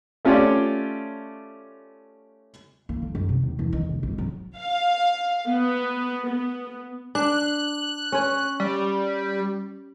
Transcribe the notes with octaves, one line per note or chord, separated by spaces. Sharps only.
A3 C#4 F4 G4 C#5 D5
A#3
D3
F#2
C3
D#2
E2
D#3
C3
G#1
F#3
F5
B3
B3
D4 F#6
C#4 C#5
G3